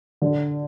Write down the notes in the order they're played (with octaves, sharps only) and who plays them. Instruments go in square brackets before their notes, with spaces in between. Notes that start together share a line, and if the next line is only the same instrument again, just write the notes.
[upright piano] D3